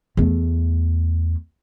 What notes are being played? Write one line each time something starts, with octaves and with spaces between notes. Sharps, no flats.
E2 A3